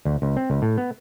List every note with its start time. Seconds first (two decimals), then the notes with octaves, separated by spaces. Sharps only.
0.05 D2
0.22 C#2
0.37 C4
0.50 C#2
0.62 A2
0.78 B3